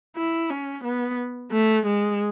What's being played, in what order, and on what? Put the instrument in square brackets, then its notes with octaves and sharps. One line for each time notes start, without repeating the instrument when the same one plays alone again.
[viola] E4
C#4
B3
A3
G#3